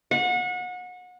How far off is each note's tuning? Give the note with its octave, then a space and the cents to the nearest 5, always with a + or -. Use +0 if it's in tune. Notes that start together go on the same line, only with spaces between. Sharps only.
F#5 -30